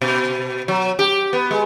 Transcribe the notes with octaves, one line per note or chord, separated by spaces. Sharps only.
B2
F#3
G4
B3
G#3